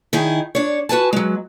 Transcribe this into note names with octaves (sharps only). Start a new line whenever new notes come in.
D#3 D#4 E4 G#4
D4 C#5
F#4 B4 G#5 A5
F#3 G#3